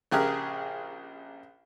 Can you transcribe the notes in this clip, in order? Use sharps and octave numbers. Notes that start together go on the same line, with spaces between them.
A#1 C#3 G4 G#4 A#4 F#6